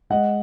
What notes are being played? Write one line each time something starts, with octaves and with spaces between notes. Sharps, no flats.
G#3 D#5 F#5